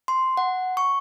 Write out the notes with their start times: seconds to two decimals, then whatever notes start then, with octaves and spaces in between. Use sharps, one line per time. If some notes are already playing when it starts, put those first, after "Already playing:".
0.08 C6
0.37 F#5
0.77 C#6